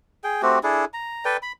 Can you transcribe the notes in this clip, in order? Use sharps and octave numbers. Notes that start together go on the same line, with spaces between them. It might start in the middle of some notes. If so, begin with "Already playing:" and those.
G#4 G5
A3 C4 F#4 G4
D4 E4 G#4 A4
A#5
A4 B4 D5 G5
B5